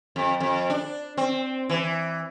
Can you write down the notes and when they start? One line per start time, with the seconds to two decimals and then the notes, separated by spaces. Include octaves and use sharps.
0.16 F2
0.40 F2
0.70 D4
1.17 C4
1.69 E3